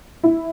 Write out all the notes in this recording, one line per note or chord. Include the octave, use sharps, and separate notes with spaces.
E4